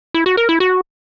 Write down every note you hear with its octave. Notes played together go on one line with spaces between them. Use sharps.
E4
F#4
A#4
E4
F#4